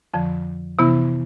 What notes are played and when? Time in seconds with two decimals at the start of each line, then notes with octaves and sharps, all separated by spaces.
0.14 F2 D3 F3
0.79 C3 E3 B3 E4